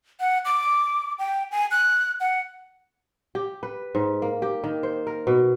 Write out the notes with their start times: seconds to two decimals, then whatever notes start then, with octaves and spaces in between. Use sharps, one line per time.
0.20 F#5
0.45 D6
1.19 G5
1.51 G#5
1.71 F#6
2.20 F#5
3.35 G4
3.63 B4
3.95 G#2
4.22 A#3
4.42 G4
4.64 D#3
4.83 C5
5.07 A#4
5.27 B2